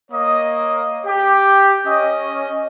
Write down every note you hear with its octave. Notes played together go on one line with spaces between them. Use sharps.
A#3 C#5 D#5 D#6
G4
C#4 D#5